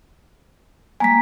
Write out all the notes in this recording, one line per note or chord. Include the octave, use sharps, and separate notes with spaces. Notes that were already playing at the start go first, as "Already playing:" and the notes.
G3 G#3 A#3 G#5 A#5 B6